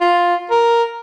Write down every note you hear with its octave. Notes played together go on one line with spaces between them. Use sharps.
F4
A#4